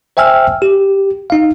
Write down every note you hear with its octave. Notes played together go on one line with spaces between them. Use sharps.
C5 E5 G5 G#5 E6 F6
G4
D#4 F5